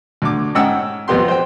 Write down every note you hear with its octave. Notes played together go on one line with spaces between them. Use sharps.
D2 D6
G#2 C#4 F#5 G5 E6
F2 B3 G4 C6
C5 G5